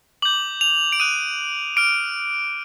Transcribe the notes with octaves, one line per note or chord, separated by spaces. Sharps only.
D6 G6 F#7
F7
D7
D#6 F#6 D#7
D6 F6 D7